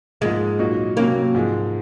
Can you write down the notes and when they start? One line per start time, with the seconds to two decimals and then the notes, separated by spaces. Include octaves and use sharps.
0.21 G#2 F3 G#3 A#3
0.59 A#2 F#3 A#3 D#4 F#4
0.97 C3 F#3 A#3 C#4 F#4
1.35 G#2 F3 G#3